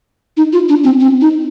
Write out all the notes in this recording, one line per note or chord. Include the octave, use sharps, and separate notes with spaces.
D#4
F4
D4
C4
C4
D#4